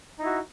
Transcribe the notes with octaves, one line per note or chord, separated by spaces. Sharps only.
D#4 E4 F#4